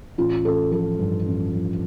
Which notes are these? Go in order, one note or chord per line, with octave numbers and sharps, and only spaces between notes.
A1 F4
A1 A4
F3 A4
G2
A1
F3